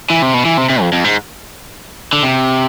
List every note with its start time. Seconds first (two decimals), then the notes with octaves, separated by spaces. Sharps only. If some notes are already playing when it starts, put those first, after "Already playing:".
0.10 E3
0.22 C3
0.34 B2
0.45 E3
0.57 C3
0.70 C3
0.81 F2
0.93 F2
1.04 G#2
2.13 D3
2.23 C3